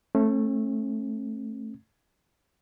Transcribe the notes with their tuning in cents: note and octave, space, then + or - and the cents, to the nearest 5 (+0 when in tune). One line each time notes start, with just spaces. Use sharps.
A3 +0 C#4 -45